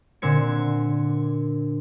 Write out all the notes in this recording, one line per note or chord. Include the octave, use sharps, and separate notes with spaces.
A#2 D3 C4 G#6 C#7